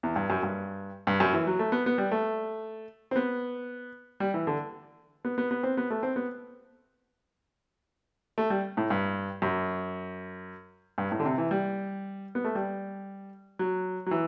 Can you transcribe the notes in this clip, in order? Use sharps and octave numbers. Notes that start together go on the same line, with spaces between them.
E2
G2
F#2
G2
G2
F#2
E3
F#3
A3
B3
B3
G3
A3
C4
B3
G3
E3
D3
B3
B3
B3
C4
B3
A3
C4
B3
A3
G3
A2
G2
F#2
G2
A2
D3
C3
E3
G3
B3
A3
G3
F#3
F#3
E3